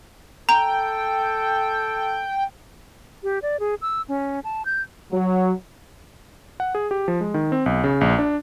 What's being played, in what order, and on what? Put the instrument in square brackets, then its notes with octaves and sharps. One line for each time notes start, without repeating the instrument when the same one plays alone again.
[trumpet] A4 [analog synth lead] G5 [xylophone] A#5
[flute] G4
D5
G#4
E6
C#4
A5
G6
[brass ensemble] F#3
[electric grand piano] F#5
G#4
G4
F3
G#3
D#3
C4
B1
C#3
A#1
D4